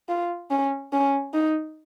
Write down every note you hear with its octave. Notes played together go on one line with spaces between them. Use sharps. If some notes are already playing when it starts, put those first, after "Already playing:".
F4
C#4
C#4
D#4